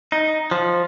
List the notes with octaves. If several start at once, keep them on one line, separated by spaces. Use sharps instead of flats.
D#4
F3